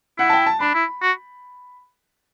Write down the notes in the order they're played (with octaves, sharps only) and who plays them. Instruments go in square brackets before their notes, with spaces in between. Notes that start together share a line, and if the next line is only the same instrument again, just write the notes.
[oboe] E4 [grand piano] F#5
[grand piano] A5
G5
A5
[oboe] D4 [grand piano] B5
[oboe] E4
F#4